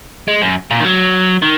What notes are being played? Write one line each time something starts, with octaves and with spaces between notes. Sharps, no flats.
G#3
F#2
A#2
D#3
F#3
D#3